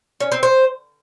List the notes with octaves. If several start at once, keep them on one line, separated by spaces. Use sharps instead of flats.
C#4
C4
C5